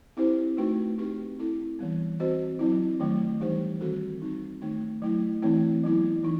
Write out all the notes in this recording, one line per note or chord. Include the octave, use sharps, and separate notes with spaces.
C4 E4 G4 C5
A3 D#4 F#4 B4
C4 D#4 G4 B4
C4 E4 A4
E3 G3 B3
C4 F#4 C5 D#5
F#3 C4 E4
D#3 F#3 A3
E3 G3 D#4 G4 C5
D#3 G3 C4 F#4 A4
G3 C4 D#4
D#3 A3 D#4
F#3 A3 E4
E3 A3 C4 E4
F#3 B3 E4
E3 D#4